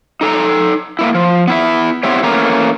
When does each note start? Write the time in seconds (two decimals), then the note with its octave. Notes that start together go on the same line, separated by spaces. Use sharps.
0.21 D#4 A4 G#5 A#5
0.99 A#3 B3 E4
1.14 F3
1.47 B3 E4 E5
2.03 B3 C4 E4 G4 C#5
2.23 E3 A3 A#3 C#4 A#5